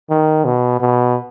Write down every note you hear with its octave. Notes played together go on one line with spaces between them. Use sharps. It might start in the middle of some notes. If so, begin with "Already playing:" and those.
D#3
B2
B2